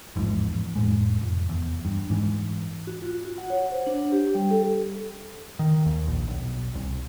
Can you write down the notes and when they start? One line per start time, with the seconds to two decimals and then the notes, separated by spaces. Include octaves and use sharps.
0.16 A1 E2 G#2 F3
0.76 F2 A2 G#3
1.21 F1
1.49 E2
1.85 G2
2.10 G#2 E3
2.87 F#4
3.02 F4
3.25 F#4
3.38 F#5
3.50 C#5
3.72 C5
3.87 D4
4.12 G4
4.35 G3
4.51 A4
5.59 D#3
5.86 D#2
6.07 A#1
6.28 B1
6.75 C2